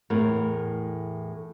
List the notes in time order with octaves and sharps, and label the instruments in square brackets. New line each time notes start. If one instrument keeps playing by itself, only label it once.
[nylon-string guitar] E2 A2 A#4